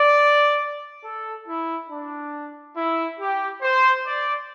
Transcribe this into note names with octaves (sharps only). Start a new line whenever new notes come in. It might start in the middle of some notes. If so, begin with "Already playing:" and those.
Already playing: D5
A4
E4
D4
E4
G4
C5
D5